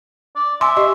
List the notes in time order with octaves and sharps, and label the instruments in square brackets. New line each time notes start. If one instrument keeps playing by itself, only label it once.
[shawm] D5
[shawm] E5 [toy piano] G#5 D6 [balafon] C6
[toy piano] G4 [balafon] D#5